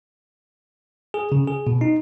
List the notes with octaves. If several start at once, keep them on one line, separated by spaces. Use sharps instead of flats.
G#4
C#3
G#4
B2
D#4